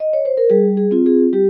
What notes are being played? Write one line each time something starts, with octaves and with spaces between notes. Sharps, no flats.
D#5
C#5
C5
A#4
G3 G#4
G#4
C4 F4
G#4
G3 G4